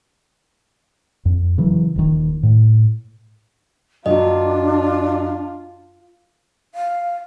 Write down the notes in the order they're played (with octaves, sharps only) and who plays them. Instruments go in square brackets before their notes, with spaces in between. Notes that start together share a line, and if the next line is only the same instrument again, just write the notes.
[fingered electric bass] F2
C#3 E3 F#3
D#1 D#3
A2
[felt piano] F#2 F#3 [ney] D4 [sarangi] F4 [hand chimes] D#5
[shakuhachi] F5